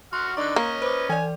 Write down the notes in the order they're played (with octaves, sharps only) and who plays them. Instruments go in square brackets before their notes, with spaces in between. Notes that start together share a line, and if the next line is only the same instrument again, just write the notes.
[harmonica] F#4 F#5 F6 [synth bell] C6
[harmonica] D3 D#4 [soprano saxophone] D5 [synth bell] C#6 F#6
[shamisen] A#3 [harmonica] C#4 D#5 [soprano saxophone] C#5 [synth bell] A#5
[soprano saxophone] B4 [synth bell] C5 D6
[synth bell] E3 D5 [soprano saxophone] G#5